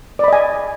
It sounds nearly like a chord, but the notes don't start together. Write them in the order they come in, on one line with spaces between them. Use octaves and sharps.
D5 B5 D#5 G#5